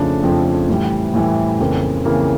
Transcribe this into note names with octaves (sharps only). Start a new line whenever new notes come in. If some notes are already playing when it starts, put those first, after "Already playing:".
Already playing: F2 C#3 F3 A3 D4
F2 C#3 F3 A3 D4
A2 E3 G3
A2 E3 G3
F2 C#3 E3 A#3
F2 C#3 E3 A#3